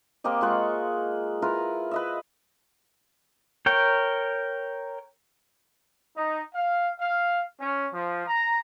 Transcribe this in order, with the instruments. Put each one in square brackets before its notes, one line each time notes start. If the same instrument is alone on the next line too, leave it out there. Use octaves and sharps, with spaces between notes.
[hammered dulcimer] A#3 C4 G4 D#5
G#3 F4 F#5 C#6
E4 F4 A#4 B4
B4 D#5 E5
[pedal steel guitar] A#4 C#5 G5
[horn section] D#4
F5
F5
C#4
F3
A#5